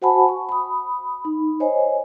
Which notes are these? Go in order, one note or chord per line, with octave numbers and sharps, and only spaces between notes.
F#4 C5 F#5 G#5 A5 B5
C#6
B5 D#6
D#4
C5 C#5 D#5 G#5